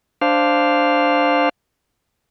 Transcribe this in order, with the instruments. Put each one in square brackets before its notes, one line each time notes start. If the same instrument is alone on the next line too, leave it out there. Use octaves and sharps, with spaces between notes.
[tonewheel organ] D4 C5 F5